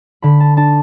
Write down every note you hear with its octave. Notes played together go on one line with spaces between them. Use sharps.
D3 B5
A5
D4 A5